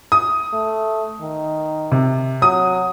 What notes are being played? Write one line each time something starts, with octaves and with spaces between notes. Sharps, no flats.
D#6
A3
D#3
C3
F#3 D#6